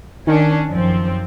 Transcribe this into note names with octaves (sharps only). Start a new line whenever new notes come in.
D#3 C#4 D4
F#2 F3 C4